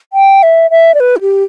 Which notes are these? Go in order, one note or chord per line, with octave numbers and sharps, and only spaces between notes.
G5
E5
E5
D5
B4
E4
G4